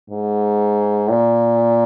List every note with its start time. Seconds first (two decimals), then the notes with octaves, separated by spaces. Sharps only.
0.10 G#2
1.10 A#2